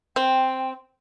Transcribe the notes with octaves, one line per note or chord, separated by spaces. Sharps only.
C4 G5